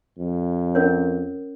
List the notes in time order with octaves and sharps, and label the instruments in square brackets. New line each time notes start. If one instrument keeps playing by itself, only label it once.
[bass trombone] F2
[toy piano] C#4 A#4 C#5